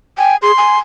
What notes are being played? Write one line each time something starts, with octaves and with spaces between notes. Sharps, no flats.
G5 G#5
G#4 C6
G#5